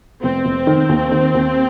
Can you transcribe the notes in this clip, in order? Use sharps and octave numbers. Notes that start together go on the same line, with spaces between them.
F1 C4
F1
D#3
D#2
D#3
D#2